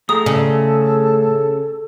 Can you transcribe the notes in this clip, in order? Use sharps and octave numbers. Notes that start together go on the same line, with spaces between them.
A2 G#4 A4 A#5 D#6
C#3